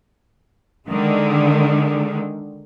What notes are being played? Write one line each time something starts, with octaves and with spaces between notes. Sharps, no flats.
D3 D#3 G#3